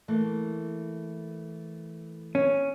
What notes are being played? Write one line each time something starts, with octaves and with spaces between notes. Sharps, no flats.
E3 A3 A#3
C#4